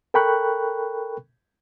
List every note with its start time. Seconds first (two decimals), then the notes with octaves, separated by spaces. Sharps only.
0.14 A4 A#4 G5 B5 C#6 F#6